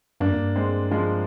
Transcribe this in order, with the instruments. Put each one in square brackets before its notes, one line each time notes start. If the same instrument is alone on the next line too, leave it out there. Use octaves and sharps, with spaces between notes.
[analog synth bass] G2 [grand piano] A#3 D4
[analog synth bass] F2
G2
[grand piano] G#3 C4
F3 G#3